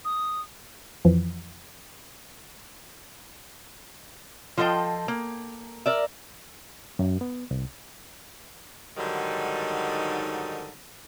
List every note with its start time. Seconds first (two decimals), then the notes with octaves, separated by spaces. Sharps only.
0.05 D#6
1.05 F2 E3 F3
4.58 F3 F4 A4 D#5 G5
5.08 A#3
5.86 A#4 D5 E5
6.99 F#2
7.21 B3
7.51 C2
8.97 G#2 D3 D#3 F#3 G3 D#4